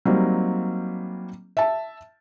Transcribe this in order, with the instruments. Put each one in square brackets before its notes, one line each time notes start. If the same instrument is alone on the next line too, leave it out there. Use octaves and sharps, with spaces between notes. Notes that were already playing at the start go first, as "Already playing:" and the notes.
[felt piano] F#3 G3 A#3 C4 D#4
E5 A5